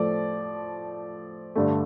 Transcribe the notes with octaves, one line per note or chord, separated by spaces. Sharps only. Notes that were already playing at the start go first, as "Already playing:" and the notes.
Already playing: A2 F3 A3 D5
G2 D3 A3